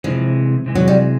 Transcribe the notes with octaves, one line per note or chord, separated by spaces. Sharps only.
C3 E3 F3 G#3
C3 E3 G#3
F#3
G3